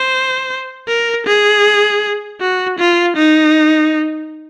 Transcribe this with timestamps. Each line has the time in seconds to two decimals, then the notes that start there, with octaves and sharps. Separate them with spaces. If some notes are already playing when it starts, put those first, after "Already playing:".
Already playing: C5
0.88 A#4
1.27 G#4
2.41 F#4
2.79 F4
3.17 D#4